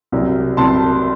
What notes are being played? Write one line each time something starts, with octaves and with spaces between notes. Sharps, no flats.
C2 C3 F#3
C2 C3 F#3 A5 C6